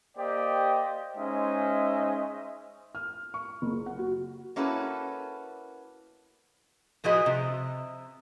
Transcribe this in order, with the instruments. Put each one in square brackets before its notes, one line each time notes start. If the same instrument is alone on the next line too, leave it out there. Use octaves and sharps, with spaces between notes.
[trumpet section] A#3 G4 C5 D5 D#5 G5
G#3 C#4 D#4 C5 D#5 E5
[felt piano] F6
C#6
F#1
F#5
F#4
[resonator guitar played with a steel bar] A#3 C#4 E4 F#4 A4 B4
A2 F3 F#4 G#4 B4 D#5
C3